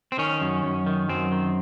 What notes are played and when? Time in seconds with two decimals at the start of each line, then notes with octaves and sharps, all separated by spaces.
0.12 C4
0.18 D#3 C#4
0.41 F#2
0.63 F#2
0.87 D#3
1.09 F#2 C4
1.32 D#3